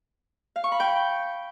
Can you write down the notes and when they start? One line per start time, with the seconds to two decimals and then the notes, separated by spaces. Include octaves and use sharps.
0.56 F5
0.64 C#6
0.72 B5
0.80 G5